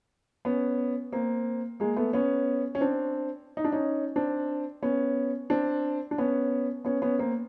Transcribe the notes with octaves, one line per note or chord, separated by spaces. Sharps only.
B3 C#4
A#3 C4
G#3 A#3
A3 B3
B3 C#4
C#4
C4 D4
D#4
D4
C#4 D#4
C4 D4
B3 C#4
C4 D4
D4
B3 C#4
B3 C#4
B3 C#4
A#3 C4